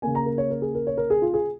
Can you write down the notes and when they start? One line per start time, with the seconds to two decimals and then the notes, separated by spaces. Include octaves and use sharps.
0.02 C#3 A#3 G#5
0.15 A#5
0.26 A#4
0.38 C#5
0.50 A#4
0.62 G#4
0.74 A#4
0.87 C#5
0.97 A#4
1.10 G#4
1.22 F4
1.34 G#4